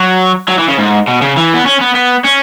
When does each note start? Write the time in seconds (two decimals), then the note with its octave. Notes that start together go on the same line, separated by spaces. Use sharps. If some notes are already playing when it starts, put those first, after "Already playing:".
Already playing: F#3
0.48 F#3
0.59 E3
0.69 C#3
0.78 G#2
1.08 B2
1.22 C#3
1.37 E3
1.54 B3
1.66 C#4
1.81 B3
1.95 B3
2.25 C#4